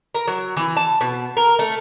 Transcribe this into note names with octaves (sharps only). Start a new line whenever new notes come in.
A#4
F#3
E3
A5
B2
A#4
A3